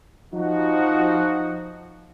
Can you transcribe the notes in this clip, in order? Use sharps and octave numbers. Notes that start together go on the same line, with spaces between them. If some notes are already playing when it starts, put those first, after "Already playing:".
F3 D#4 F#4